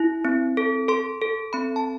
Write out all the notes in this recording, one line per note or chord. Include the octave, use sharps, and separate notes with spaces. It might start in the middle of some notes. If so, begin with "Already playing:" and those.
Already playing: E4
C4
A4
A4 C6
A4
C4 B5
A5